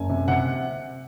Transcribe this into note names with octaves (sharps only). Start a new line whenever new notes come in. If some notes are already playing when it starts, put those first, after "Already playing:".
Already playing: F#1 G#5
C3
C3 F#5